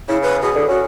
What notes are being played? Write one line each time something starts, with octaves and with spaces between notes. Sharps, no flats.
C#3 E4
B4
B2 G#4
D3
C#4 F#4